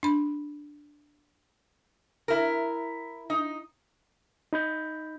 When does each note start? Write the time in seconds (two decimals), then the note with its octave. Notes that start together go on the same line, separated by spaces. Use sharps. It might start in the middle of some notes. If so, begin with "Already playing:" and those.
0.03 D4 B5
2.28 E4 A#4
3.30 D#4
4.53 D#4 B5 G6